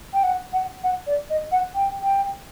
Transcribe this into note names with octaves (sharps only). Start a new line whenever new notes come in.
G5
F#5
F#5
F#5
D5
D#5
F#5
G5
G5